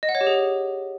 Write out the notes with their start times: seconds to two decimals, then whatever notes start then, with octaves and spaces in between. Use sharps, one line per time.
0.03 D#5
0.09 F#5
0.15 C#5
0.21 G4
0.27 G#4